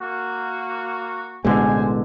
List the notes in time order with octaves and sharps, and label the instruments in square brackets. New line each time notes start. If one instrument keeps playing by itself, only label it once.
[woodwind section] A#3 F#4
[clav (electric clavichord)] A1 D3 [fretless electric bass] B2 G#3 [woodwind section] C5 G#5